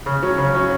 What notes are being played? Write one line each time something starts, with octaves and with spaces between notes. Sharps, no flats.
C#3
F#3 C#4
C#3
F#3 C#4